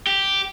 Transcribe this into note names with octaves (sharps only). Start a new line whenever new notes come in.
G4